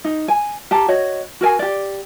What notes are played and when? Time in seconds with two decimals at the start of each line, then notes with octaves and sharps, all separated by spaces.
0.05 D#4
0.28 G#5
0.71 G4 A5 A#5
0.88 F#4 C#5 D#5
1.41 F#4 A#4 G#5
1.59 G4 D5